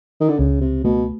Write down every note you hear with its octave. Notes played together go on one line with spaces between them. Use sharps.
D#3
D3
C#2 C#3
C3
B2 A3